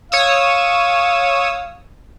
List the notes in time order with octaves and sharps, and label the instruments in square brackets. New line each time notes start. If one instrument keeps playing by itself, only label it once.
[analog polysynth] C#5 D#6 E6 [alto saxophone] F5